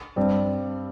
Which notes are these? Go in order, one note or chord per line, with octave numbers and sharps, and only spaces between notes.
G2 G3 C4